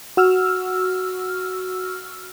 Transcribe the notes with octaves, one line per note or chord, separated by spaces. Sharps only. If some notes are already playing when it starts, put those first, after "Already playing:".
F#4 E6 F6